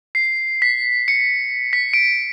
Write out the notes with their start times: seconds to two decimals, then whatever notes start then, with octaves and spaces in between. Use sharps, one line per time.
0.15 C7
0.62 B6
1.08 C#7
1.73 B6
1.93 D7